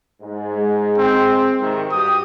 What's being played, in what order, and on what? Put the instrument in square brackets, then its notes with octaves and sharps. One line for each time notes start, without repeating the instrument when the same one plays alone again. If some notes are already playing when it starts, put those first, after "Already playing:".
[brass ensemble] G#2
[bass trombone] G#3
[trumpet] C4
[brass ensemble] G#2 C3 D#3
[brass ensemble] G2 F#4 G4 [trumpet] D#6